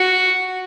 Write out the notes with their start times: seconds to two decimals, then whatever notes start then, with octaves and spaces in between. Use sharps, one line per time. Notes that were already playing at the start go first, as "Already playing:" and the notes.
Already playing: F#4